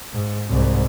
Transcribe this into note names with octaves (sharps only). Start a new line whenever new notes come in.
G#2
C2 G#2